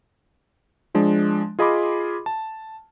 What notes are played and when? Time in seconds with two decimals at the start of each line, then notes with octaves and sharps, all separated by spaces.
0.95 F3 G#3 D4
1.59 F4 G#4 D#5 B5 C6 D6
2.26 A5